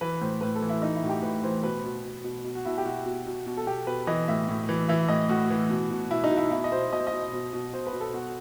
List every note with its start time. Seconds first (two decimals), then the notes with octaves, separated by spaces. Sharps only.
0.01 E3 B4
0.21 A2 C5
0.41 A2 B4
0.55 A4
0.62 E3
0.69 E4
0.82 E3 D#4
0.96 E4
1.02 A2 F#4
1.09 G4
1.22 A2 B4
1.43 E3 C5
1.63 B2 B4
1.85 B2
2.05 B2
2.24 B2
2.44 B2
2.55 F#4
2.65 B2 E4
2.78 G4
2.85 B2 F#4
3.06 B2
3.26 B2
3.46 B2
3.57 A4
3.67 B2 G4
3.87 B2 B4
4.07 E3 D#5
4.28 A2 E5
4.49 A2
4.69 E3
4.89 E3 E5
5.08 A2 D#5
5.29 A2 F#4
5.50 E3
5.70 B2
5.90 B2
6.11 B2 E4
6.24 D#4
6.31 B2
6.37 E4
6.51 B2 E4
6.64 D#5
6.72 B2 C5
6.92 B2 D#5
7.00 C5
7.07 D#5
7.12 B2
7.33 B2
7.53 B2
7.73 B2 C5
7.87 B4
7.93 B2
8.00 A4
8.14 B2 F#4